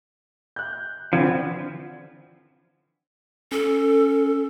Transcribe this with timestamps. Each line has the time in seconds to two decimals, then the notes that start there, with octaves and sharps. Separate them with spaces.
0.56 F#6 G6
1.13 D3 E3 F3 C4 G#6
3.52 C#4 A4